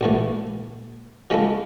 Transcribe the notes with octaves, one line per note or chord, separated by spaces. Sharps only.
A#1 A2 E3 A3
F3 G#3 C#4 E4 A4